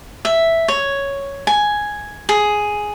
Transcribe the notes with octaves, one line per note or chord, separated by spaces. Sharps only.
E5
C#5
G#5
G#4